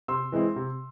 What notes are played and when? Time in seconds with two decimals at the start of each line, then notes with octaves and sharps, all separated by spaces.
0.08 C3 C6 E6
0.32 E3 G#3 C4 E4
0.56 C3